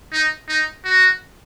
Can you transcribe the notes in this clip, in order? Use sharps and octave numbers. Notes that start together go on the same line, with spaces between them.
D#4
D#4
F#4